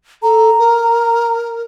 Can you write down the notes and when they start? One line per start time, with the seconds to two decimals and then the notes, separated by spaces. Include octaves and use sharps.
0.23 A4 A#5
0.59 A#4